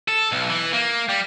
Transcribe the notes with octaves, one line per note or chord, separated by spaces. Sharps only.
A4
B1
E3
A#3
G3